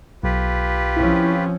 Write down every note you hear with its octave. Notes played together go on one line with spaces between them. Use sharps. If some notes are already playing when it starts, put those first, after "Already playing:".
B1 F4 G4 B4
F3 C4 C#4 E4